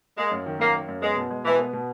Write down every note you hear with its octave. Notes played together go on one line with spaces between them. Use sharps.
G#3 A#3
F#2
D#3
F#2 A#3
A#3
F#2
G#3 B3
B2
G#3
B2 E3
B3
B2